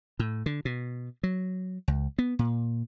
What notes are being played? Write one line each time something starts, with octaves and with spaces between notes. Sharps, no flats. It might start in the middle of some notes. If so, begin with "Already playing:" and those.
A2
D3
B2
F#3
C#2
B3
A#2